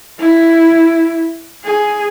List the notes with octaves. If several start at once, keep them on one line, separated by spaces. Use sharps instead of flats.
E4
G#4